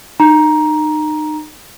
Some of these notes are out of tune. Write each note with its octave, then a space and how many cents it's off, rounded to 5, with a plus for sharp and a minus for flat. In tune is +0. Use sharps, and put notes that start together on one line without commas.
D#4 -30 A#5 +10